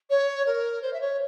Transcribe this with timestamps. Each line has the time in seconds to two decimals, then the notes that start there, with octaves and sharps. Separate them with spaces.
0.10 C#5
0.46 A#4
0.82 C5
0.93 E5
1.01 C#5